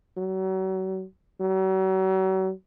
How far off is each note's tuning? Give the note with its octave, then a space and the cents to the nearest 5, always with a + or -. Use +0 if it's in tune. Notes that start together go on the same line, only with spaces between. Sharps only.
F#3 +35
F#3 +40